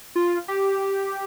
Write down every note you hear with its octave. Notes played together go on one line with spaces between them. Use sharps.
F4
G4